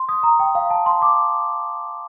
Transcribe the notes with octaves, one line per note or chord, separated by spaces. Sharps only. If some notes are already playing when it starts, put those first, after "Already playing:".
Already playing: C6
D#6
A#5
G5
F5
A5
C6
D6